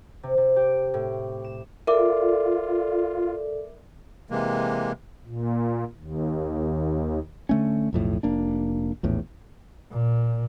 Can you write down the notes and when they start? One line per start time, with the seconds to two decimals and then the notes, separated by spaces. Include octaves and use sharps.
0.23 C3
0.37 C3
0.56 G4
0.94 A2
1.44 E7
1.87 F4 A4 A#4 D5 E5 D6
4.30 C3 E3 G#3 A#3
5.26 A#2
5.97 D#2
7.49 D3 A3 C#4
7.93 B1 F2 A2
8.23 F1 A#3 D4
9.03 A#1 E2 A2
9.91 A#2